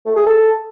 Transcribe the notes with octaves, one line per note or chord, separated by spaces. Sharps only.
A3
G#4
A4